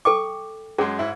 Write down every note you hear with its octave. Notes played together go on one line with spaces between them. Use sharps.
A4 G5 C#6 D6
F#2 G#3 G#4
G#2 E4